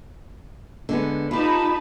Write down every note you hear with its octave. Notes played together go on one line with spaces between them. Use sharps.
D3 G#3 B3
D#4 F4 G4 A5 B5